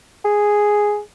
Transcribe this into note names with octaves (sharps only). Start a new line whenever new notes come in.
G#4